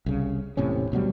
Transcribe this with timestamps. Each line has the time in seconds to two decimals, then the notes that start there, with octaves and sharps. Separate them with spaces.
0.06 C2 C#3
0.57 E1 A2 C3 C#4
0.92 D2 B2 F#3 G3